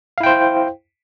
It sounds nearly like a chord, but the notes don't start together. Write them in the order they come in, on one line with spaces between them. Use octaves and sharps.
F5 E4 G5 C5